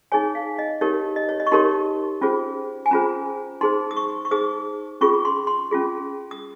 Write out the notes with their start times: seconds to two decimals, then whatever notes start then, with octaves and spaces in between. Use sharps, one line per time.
0.12 D#4 G#4 C#5 G#5
0.35 F5
0.59 D#5
0.81 D#4 G4 A#4 C#5
1.16 D#5
1.29 C#5
1.40 D#5
1.47 C#6
1.52 D#4 G4 A#4 C#5 C6
2.21 C#4 F4 G#4 C5
2.86 G#5
2.91 C#4 F4 G#4 C5 A#5
3.61 D#4 G#4 C5 C6
3.91 D#6
3.97 C#6
4.25 C#6
4.31 D#4 G#4 C5 D#6
5.01 C#4 F4 G#4 C#6
5.25 C6
5.47 C6
5.71 C#4 F4 G#4
6.31 D#6